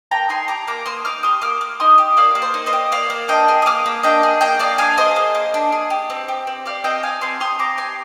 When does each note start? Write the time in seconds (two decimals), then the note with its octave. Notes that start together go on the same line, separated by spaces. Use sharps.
0.11 A#3 G5 A#5
0.29 D#4 G#5 C6
0.48 G4 A#5 D6
0.67 A#3 A#5 D6
0.86 A#3 C6 D#6
1.05 D#4 D6 F6
1.23 G4 C6 D#6
1.42 A#3 D6 F6
1.61 A#3
1.80 D#4 C6 D#6
1.98 G4
2.17 A#3 D5 F5
2.35 A#3
2.42 C5
2.54 D#4
2.66 C5 D#5
2.73 G4
2.92 A#3 D5 F5
3.10 A#3
3.28 D4 D#5 G5
3.48 G#4
3.62 D#6
3.66 A#3 D6 F6
3.86 A#3
4.03 D4 D#5 G5
4.23 G#4
4.41 A#3 D#5 G5
4.59 A#3 D5 F5
4.78 D4 F5 G#5
4.98 G#4 C5 D#5
5.16 A#3
5.35 A#3
5.54 D4
5.72 G#4
5.90 G4
6.10 C4
6.28 G4
6.47 C4
6.66 G4 D5 F5
6.84 C4 D#5 G5
7.03 G4 F5 G#5
7.21 C4 G#5 C6
7.40 G4 C6 D#6
7.59 C4 A#5 D6
7.77 G4 G#5 C6